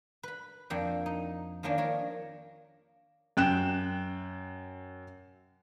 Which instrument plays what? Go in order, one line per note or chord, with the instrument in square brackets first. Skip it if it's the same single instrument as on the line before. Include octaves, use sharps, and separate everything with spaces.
[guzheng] B4 B5
F2 A#3 D4 G5
D#4
D#3 F3 A#3 C#4 D4
D4 A#4 C#5
[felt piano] F#2 G5 F#6 E7